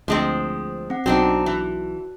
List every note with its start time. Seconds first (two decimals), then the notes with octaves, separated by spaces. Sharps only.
0.08 D2 F3 G#3 C4
0.90 C4 F#5
1.06 B1 C4 D4 D#4 F#4
1.46 E3